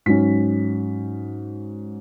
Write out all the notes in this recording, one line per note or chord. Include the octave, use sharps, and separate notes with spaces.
G#2 F#3 C#4 B6